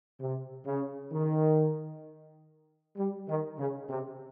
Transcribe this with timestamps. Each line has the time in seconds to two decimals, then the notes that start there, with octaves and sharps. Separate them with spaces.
0.20 C3
0.66 C#3
1.12 D#3
2.97 G3
3.28 D#3
3.58 C#3
3.89 C3